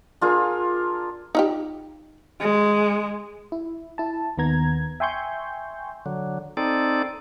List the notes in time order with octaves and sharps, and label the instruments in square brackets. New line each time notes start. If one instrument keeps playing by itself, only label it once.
[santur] D4 F4 G#4 A#4
[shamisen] D#4 F4 G4
[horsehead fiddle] G#3
[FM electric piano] E4
E4 A5
D#2 D#3 B3 A#5 G#6
E5 G5 G#5 C6 C#6 G6
[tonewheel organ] D3 F#3
C4 D#4 A4 D5